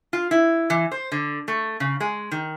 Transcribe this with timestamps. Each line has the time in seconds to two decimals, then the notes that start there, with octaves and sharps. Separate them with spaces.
0.13 F4
0.31 E4
0.70 E3
0.92 C5
1.12 D3
1.48 A3
1.80 C#3
2.00 G#3
2.32 D#3